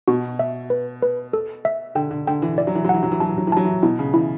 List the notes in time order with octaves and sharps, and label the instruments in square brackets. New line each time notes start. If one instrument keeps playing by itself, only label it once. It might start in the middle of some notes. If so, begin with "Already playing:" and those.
[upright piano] B2 [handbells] F#4
[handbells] E5
B4
B4
A4
E5
[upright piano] D3 [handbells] G5
[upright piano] D3
[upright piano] D3 [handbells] G5
[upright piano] E3
[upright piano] E3 [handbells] D5
[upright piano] F#3
E3
F#3
[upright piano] E3 [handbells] F#5
[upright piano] F#3
E3
[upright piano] F#3 [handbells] A5
[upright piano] E3
F#3
E3
[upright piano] F#3 [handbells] A5
[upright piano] E3
[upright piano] B2 [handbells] E4
[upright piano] C#3
[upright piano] E3 [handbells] E4